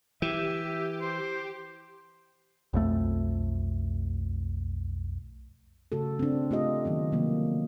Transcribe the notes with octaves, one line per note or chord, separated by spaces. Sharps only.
E3 G4 E5
C5
B1 F2 A3
C#3 A3 F#4 A4
C4 D4
A3 F4 G4 D#5
D#3 F#3 B3
C3 F3 F#3 A#3